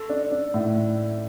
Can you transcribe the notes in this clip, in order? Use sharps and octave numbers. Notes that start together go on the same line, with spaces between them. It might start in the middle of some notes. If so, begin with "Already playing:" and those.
Already playing: A4
D4
D4
A2